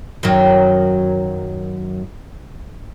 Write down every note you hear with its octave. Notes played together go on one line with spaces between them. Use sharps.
F#2 D#3 F#3